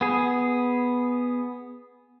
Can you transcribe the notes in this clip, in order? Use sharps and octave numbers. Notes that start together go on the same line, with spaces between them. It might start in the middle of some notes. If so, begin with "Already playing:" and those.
B3 G#4